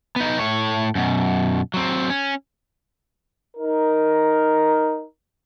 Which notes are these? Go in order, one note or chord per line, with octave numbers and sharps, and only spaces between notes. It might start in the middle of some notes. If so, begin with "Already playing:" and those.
B3 D#4
A2 C#5
F#2 B2
F#3 C4
C#4
D#4 A#4